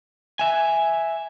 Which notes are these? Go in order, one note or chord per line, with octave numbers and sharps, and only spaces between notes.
E5 G#5